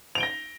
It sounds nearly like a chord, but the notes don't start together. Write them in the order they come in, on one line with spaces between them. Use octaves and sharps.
F7 D7 G7 A#6